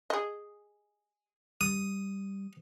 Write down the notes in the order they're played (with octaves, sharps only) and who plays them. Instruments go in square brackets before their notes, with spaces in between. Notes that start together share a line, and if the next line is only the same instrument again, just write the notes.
[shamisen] G#4 D#5
[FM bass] G3 [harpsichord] D#6